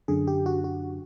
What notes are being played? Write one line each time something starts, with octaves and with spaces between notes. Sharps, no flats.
F#2 D3 G#4
G4
F#4
F#4